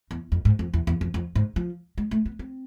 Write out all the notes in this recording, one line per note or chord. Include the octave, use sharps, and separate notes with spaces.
E2
F2
G#2
F2
E2
E2
F2
F2
G#2
F3
G#3
A3
B3
C4